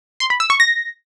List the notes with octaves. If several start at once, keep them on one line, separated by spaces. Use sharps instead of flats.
C6
B5
E6
C#6
A#6